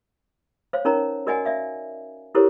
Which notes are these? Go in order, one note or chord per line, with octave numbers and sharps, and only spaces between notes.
C5 C#5 F5
C#4 D#4 A#4 C#5 A#5
F#4 A#4 D5 D#5 F#5 G#5
D5 E5 F5
E4 G4 A4 A#4 C5 C#5